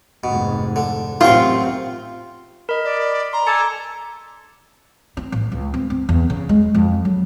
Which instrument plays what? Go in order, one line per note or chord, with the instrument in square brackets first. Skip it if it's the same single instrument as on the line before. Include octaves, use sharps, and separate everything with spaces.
[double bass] F1 G#2 [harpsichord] B2
[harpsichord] D3
[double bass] A1 C4 [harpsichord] F#2 G4 C#6 [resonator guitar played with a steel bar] F4
[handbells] A#4 D#5 [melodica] B5
[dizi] D5
[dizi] A#5 [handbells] C6
[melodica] A4 G#5 A5 [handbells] D6 C#7
[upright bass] C4
A1
C#2
C4
C4
E2
C#3
G#3
F2
F#3